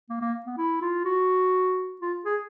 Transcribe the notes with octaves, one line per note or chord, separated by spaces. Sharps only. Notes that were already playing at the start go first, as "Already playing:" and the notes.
A#3
A#3
B3
E4
F4
F#4
F4
G#4